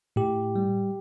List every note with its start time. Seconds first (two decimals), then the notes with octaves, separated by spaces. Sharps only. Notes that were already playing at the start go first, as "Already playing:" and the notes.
0.16 A2 G4
0.56 G3